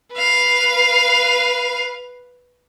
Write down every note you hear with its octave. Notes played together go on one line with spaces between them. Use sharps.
B4 F5